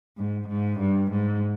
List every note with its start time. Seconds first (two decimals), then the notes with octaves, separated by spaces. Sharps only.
0.18 G#2
0.48 G#2
0.80 G2
1.11 G#2